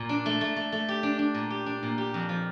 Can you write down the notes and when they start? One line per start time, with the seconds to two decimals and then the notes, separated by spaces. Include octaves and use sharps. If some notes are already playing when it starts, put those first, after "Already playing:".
Already playing: A#2
0.09 D4
0.26 A3
0.41 A3
0.56 A3
0.72 A3
0.88 G4
1.03 D4
1.19 D4
1.34 A#2
1.50 G4
1.66 D4
1.83 A#2
1.98 G4
2.14 F2
2.29 F3